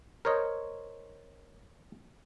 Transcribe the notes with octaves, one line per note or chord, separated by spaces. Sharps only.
A#4 C5 C#5 D#5